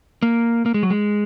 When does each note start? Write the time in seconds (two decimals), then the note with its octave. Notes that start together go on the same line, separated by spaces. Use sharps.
0.23 A#3
0.66 A#3
0.74 G#3
0.83 F#3
0.90 G#3